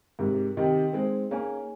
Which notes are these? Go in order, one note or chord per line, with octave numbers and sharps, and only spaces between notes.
G#2 C3 A#4
C3 D#3 D#5 G5
G#3 C4 D#4
A#3 C#4 G#4 C#5 G#5